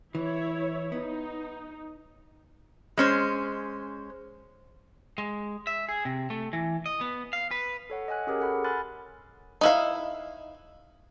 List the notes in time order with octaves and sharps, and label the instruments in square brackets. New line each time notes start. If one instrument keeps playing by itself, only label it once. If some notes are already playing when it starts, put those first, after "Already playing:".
[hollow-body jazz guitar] E3 [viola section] E4 C#5
[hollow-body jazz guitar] B3 [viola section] D#4
[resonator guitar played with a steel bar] G#3 C#4 C5
[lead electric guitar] G#3
E5
G#4
C3
A3
E3
D#5
B3
F5
B4
[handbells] A4 C#5 F#5
D#5 F#5 G#5 F#6
C#4 G4 G#4 A#4 C#5
A4 F#5 B5
G#5 B5 C6 F6 F#6 A6
[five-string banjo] D#4 E4 F5